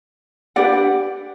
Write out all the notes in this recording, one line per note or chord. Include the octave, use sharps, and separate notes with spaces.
D4 G4 B4 D5 F#5